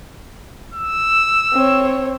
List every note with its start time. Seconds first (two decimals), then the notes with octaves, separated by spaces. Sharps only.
0.74 E6
1.53 C4 C#5